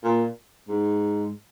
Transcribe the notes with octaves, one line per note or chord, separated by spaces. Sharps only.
A#2
G#2